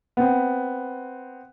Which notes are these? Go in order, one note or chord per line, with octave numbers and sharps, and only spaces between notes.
B3 C4